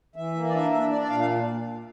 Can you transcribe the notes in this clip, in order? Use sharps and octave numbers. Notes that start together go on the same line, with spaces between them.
E3 E5
A#3
D5
D4 E5
D4 E5
D4 D5
D5
A#2 F5
F5